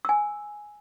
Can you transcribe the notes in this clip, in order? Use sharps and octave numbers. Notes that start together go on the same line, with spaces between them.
G#5 E6